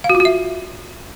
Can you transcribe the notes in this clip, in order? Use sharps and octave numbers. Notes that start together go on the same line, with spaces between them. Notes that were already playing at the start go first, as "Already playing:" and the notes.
F5
F#4
F4
F#4
E5